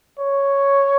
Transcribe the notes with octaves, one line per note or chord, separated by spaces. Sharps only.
C#5